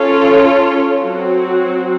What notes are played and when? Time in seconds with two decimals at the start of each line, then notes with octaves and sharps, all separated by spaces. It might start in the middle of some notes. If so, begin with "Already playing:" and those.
Already playing: C#4 F4 A4 C#5
1.00 F#3 C4 F#4